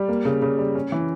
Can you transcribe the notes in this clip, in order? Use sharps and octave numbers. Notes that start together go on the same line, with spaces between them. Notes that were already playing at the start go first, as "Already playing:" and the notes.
Already playing: G3
A#3
C#3
C#3
G3
C#4
E3